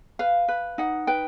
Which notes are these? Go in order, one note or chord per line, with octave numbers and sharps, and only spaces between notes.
B4 F5
B4
D#4 F#5
B4 G5